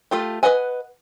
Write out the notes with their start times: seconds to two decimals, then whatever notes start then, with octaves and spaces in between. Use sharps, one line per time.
0.11 A3 F4 G4
0.43 B4 C5 D#5 F#5 G#5